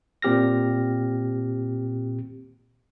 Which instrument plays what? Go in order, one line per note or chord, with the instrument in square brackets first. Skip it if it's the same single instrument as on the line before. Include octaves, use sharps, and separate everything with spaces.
[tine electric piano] A#2 C4 G4 F6 A#6